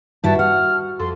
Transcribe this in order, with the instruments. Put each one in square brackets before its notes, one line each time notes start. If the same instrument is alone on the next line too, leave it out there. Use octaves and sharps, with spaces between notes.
[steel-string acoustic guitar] G2 E4 [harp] F#4 B4 E5 [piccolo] A5
[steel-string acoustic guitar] F#5 [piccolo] F6
[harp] F2 A4 [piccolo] C6